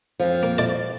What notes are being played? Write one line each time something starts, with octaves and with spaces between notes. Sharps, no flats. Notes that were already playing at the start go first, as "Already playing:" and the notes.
F2 F3
A#3
E4 A4 D5